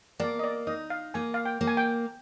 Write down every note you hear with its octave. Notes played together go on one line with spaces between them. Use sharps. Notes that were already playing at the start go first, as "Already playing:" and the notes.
A#3 D5
D#5
D5
D#4 D#5
F5
A#3 G#5
F5
G5
A#3
G#5
G5